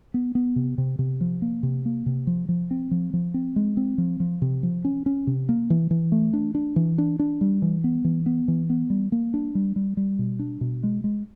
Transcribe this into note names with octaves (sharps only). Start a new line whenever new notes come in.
B3
B3
C3
C3
C3
F3
A#3
C3
A#3
C3
F3
F3
C4
F3
F3
C4
G#3
C4
F3
F3
C3
F3
C#4
C#4
C3
A#3
E3
E3
A3
D4
D4
E3
D4
D4
G3
E3
B3
E3
B3
E3
B3
G3
A#3
D4
G3
G3
G3
B2
D4
B2
G#3
G#3